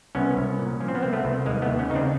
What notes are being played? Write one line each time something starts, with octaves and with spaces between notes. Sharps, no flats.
C2 B3 C#4
C2
A#2
F3 C#4
C4
B3
C2 A#3 C4
A3 B3
C2
D#2 G#3 A#3
A3 B3
D#2
B3 C#4
C#3 D#4
C4 D4